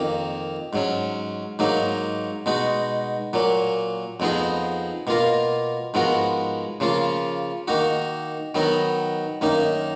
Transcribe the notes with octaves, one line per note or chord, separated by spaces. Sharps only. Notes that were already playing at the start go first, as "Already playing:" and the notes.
Already playing: F2 D#3 A#3
G#2 F#3 C#4
G#2 F#3 A#3 D#4
B2 G#3 D#4 F#4
A#2 F#3 A#3
F2 F3 B3 D#4 G#4
B2 A#3 F4 A#4
G#2 F3 B3 F#4 A#4
C#3 F3 A#3 F4
D#3 A#3 D#4 F#4
D#3 F#3 B3 D#4 A#4
F#2 D#3 A#3 D#4